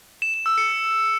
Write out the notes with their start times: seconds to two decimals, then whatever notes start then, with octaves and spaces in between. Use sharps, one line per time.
0.22 E7
0.34 E7
0.46 E6
0.58 C#7